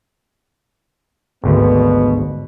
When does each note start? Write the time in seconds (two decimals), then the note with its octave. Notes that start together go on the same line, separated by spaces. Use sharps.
1.44 G#1 D2 B2 D3 B3